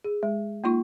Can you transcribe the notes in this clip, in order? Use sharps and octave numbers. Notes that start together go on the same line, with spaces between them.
G#4
G#3
A#3 D#4 F4 C#6